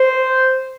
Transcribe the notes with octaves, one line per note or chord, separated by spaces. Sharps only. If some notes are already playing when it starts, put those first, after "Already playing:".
Already playing: C5